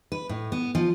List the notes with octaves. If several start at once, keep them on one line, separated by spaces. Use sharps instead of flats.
B4
A2
B3
F3